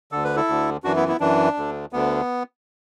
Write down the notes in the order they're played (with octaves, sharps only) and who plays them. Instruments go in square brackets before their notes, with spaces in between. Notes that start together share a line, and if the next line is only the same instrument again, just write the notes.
[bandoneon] D2 D3 A4
B4
E4 A4
D2 D3
F#2 E3 D4 F#4
B3 E4
B3 E4
F#2 E3 D4
D2 D3
D2 D3 B3